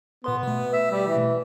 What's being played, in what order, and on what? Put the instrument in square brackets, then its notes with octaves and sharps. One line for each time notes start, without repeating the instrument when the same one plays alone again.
[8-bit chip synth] A#2 B4 C6 [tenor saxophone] B3
[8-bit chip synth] B2 A3
[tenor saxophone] E5
G3
E3